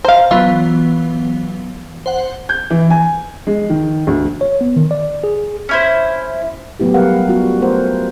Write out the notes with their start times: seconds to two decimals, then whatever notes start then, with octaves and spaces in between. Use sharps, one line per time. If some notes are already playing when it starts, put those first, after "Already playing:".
0.05 C5 F5 A#5
0.31 E3 F#3 B3 F4
2.06 C5 F#5
2.49 G6
2.70 E3
2.90 G#5
3.47 G#3
3.70 D#3
4.07 D2
4.41 C#5
4.61 B3
4.76 D#3
4.91 D5
5.24 G#4
5.69 C#4 E4 C5
6.80 F#3 A3 B3 E4 G4
6.94 G3 A#4 B4 F5 F#5
7.14 G3
7.29 B3 C#4 F4 F#4
7.61 A3 B3 A#4 C5 F#5